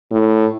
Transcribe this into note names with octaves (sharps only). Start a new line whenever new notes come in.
A2